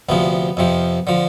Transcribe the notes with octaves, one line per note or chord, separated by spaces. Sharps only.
D2 C3 F3 B3
F2 C3 F3
D3 F3